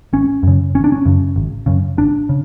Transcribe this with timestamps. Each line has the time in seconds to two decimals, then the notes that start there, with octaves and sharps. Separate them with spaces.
0.13 G#1 C#4
0.43 F#2 C#3
0.75 G#1 C#4
0.84 D4
0.92 C#4
1.05 F#2 C#3
1.36 G#1
1.66 F#2 C#3
1.97 G#1 D4
2.29 C#3